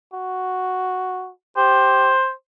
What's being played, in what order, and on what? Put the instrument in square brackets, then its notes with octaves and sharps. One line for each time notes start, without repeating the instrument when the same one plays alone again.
[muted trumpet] F#4
[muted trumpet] G4 [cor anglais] C5